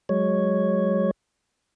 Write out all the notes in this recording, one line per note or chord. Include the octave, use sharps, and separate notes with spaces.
F#3 G#3 C#5